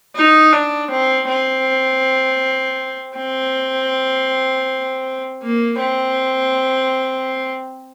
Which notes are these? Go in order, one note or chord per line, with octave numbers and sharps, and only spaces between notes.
D#4
D4
C4
C4
C4
A#3
C4